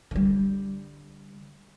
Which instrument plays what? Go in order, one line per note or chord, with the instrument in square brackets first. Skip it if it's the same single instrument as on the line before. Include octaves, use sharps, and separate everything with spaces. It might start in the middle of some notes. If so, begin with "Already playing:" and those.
[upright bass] D3 G3